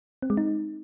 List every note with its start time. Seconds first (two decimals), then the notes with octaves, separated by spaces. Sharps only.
0.22 C4
0.30 G#3
0.37 D#4